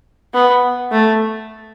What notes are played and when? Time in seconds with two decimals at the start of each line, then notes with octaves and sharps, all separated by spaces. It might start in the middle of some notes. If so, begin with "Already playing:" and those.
0.34 B3
0.92 A3